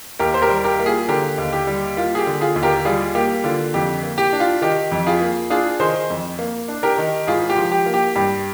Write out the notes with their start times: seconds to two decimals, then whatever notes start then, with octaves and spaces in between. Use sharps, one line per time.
0.19 D#2 G4 A#4
0.34 C5
0.42 G4 A#4
0.49 G3
0.64 G4 A#4
0.79 A#3
0.86 F4 G#4
1.08 D3 G4 A#4
1.38 D#2
1.53 G4
1.67 G3
1.97 A#3 F4
2.15 G#4
2.19 G4
2.26 D3
2.41 F4 G#4
2.56 D#2
2.63 G4 A#4
2.85 G3 F4 G#4
3.15 A#3 G4
3.44 D3 F4
3.74 F2 G4
4.03 A#3
4.18 G4
4.33 D4
4.40 F4
4.62 D#3 G4
4.92 F2
5.07 F4 G#4
5.21 A#3
5.50 D4 F4 G#4
5.80 D#3 G#4 C5
6.10 F2
6.39 A#3
6.68 D4
6.83 G4 A#4
6.98 D#3
7.27 G#1 F4 G#4
7.50 G4
7.57 F3
7.71 G4
7.86 A#3
7.94 G4
8.16 G2 G4